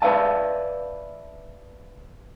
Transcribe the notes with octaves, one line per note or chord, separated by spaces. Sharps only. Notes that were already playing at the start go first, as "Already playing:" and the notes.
B4 D5 E5 F5 A5